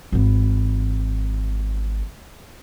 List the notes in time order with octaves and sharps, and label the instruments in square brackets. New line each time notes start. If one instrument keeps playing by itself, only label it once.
[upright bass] G#1 E3